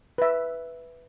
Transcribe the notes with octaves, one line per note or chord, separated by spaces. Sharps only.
B4 E5